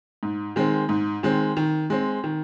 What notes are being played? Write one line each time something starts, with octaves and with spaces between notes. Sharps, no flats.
G#2
D#3 G#3 C4
G#2
D#3 G#3 C4
D#3
G#3 C4
D#3